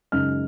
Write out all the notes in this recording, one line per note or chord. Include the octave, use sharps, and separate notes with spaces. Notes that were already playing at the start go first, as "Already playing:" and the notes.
F#2 C#3 G#3 D#4 F6